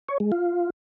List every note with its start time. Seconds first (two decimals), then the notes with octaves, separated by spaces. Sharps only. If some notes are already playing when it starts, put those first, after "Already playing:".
0.09 C#5
0.20 G#3
0.32 F4